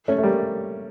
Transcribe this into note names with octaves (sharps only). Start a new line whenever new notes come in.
A3 C#4
A3
G3 A#3